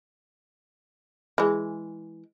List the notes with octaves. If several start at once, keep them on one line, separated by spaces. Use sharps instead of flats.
E3 G#3